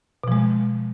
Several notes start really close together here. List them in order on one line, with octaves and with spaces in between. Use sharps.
B2 F3 G#3